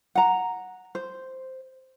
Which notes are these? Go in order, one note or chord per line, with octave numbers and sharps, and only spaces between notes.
F#5 A#5
C5